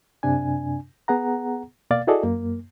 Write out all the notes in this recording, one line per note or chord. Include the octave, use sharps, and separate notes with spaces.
F#2 C3 D4 G#5
B3 G#4 F#5 A#5
B2 A#3 D5 F5 A6
E4 F#4 G#4 A4 D5 D#5
F#2 A#3